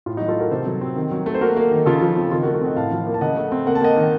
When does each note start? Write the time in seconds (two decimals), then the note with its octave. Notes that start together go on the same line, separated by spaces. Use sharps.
0.06 A2 F4
0.17 D#4 F#4
0.21 F#3
0.28 F4 A4
0.36 A3 F#4 A#4
0.51 C3 A4 C5
0.66 F#3
0.81 C4
0.96 D#3
1.11 F#3
1.26 A3
1.34 C5
1.41 A#3 F#4 A#4
1.57 A#3
1.71 D#3
1.86 C#3 F4 A4
2.01 F3
2.17 C4
2.31 D#3 F4 A4
2.43 F#4 A#4
2.47 A3
2.54 F#4 A#4
2.61 C4 D#5 F#5
2.76 A2 F5 A5
2.91 F3
3.07 A#3
3.14 A5
3.21 C#3 D#5 F#5
3.36 A3
3.52 C4
3.66 A#3 F#5
3.75 A5
3.81 A#3 D#5 F#5
3.96 D#3